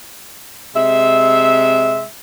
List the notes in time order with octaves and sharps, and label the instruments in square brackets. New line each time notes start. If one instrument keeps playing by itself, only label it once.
[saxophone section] C3 G#3 E5